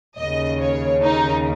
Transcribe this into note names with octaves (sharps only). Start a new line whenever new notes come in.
D#2 C#3 D#5
C#5
D#4